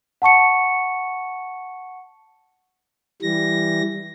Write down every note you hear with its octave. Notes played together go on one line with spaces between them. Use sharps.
F#5 A5 C#6 C#7
E3 G3 A#6